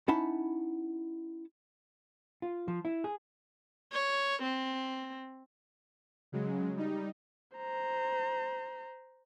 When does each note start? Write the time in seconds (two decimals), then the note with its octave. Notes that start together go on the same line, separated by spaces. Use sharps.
0.08 C#4 D#4 E4 F#5 A5 B5
2.42 F4
2.68 F3
2.85 E4
3.04 G#4
3.92 C#5
4.42 C4
6.32 C#3 F#3 G#3
6.77 G3 D#4
7.56 C5 A#5